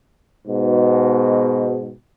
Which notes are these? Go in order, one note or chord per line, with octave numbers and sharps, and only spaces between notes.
G#2 B2